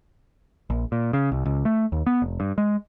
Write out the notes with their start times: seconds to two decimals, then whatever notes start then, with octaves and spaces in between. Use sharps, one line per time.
0.70 A#1
0.92 A#2
1.13 C#3
1.32 C2
1.46 C#2
1.65 A3
1.92 D#2
2.06 B3
2.22 F1
2.40 G2
2.58 G#3